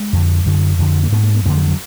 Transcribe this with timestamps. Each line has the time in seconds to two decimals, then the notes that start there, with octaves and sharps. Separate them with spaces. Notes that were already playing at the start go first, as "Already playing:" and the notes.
Already playing: G#3
0.13 F2 D3
0.46 F#2 D3
0.79 F2 D3
1.03 A#3
1.12 G#2 B3
1.23 A#3
1.35 B3
1.46 F2 D3 A#3
1.57 F#3
1.68 F#3